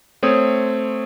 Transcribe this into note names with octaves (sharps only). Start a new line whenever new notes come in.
A3 C4 C#5 D#6